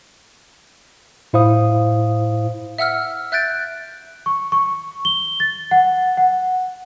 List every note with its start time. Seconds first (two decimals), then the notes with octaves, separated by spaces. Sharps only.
1.33 A2 E4 C5 F5 D#6
2.78 E5 F#5 E6 F6
3.32 E5 F#6 G6 A6 D7
4.26 C#6
4.52 C#6
5.05 G7
5.40 A6
5.71 F#5
6.17 F#5